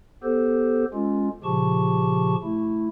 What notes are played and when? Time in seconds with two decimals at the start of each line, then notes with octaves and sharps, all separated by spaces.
0.23 B3 G4 A4 C5
0.94 G#3 C#4 F4
1.44 A#2 C#3 F3 G4 A5 C#6
2.43 A3 E4